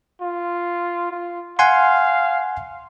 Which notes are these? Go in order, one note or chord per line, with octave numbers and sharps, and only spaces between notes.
F4
F4
F5 F#5 G#5 C6